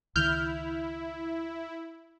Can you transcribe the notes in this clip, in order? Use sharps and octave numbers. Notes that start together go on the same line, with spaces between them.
C#2 D#3 E4 F6 G6